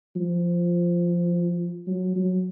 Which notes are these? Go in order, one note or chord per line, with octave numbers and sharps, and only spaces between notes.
F3
F#3
F#3